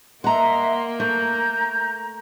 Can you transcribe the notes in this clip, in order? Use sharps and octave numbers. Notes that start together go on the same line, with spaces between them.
A#3 D#5 E5 F#5 A#5 C6
A3 A#5 G6